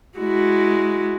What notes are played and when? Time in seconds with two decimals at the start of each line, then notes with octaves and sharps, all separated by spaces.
0.18 G#3 E4 F#4